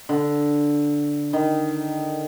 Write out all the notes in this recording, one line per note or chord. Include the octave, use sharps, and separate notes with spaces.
D3
D#3